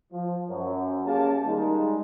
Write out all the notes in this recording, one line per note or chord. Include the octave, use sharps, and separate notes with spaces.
F3
F#2
A#3 C#4 G4 G#4 F5 A5
D#3 G3 G#3 D#4